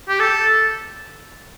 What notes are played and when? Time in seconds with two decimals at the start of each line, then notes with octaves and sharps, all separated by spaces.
0.09 G4
0.20 A4